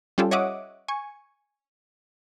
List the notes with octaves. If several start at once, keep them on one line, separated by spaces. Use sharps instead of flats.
G3 C#4 F4 G4 A4
C#5 D#5 E5 F#5 D6 D#6
G#5 C#6